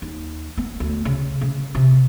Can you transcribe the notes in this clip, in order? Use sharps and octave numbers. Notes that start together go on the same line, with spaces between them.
D#2
B3
D2
C#3
C#3
C3